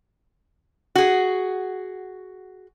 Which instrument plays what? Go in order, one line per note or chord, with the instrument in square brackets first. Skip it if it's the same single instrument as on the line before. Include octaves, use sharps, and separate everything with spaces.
[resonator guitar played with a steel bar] F#4 G#4